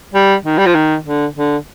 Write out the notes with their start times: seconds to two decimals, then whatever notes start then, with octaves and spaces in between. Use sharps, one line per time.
0.14 G3
0.45 D#3
0.58 G3
0.66 F3
0.75 D#3
1.05 D3
1.36 D3